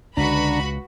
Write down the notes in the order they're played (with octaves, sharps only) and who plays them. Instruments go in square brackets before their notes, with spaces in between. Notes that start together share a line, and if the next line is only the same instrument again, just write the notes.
[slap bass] C#2 [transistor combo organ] D3 D4 A#5 [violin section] F#4 B4 B5